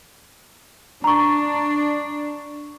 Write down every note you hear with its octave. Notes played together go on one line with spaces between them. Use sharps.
D4 A#5 C#6